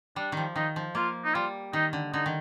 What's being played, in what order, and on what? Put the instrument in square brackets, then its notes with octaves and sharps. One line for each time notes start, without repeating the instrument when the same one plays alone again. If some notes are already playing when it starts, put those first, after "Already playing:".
[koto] G3 [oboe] D4
[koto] D#3 F3
[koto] D#3 [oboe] D#4
[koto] F3
[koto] A#3 [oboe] F4
[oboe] D#4
[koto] G3 [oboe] F4
[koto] D#3 [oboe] D#4
[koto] D3
[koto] D3 [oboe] D#4
[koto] D#3